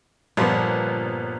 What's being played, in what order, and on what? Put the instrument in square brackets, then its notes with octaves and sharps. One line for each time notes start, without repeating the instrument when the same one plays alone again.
[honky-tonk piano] G1 B3 [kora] A#2 F3 G3